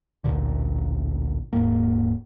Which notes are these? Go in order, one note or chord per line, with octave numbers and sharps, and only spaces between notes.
A1 D2 A#2 D3
D#1 G#2 A#3